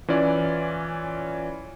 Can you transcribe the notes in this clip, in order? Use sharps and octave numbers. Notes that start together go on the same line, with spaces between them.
E3 C#4 F4 D5